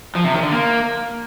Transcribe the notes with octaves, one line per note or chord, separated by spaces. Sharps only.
F3
C3
D#3
D3
A#3